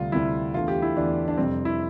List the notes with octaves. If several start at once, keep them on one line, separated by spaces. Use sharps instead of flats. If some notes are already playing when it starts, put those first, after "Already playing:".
Already playing: D2 C3 G3 F4
D2 C3 G3 E4
E2 D3 A3 F4
G4
E4
E2 D3 A3 D4
D4
F2 C3 G3 C4
E4